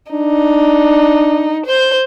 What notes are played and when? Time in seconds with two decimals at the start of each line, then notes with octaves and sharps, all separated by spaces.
0.12 D4 D#4
1.66 C5 G6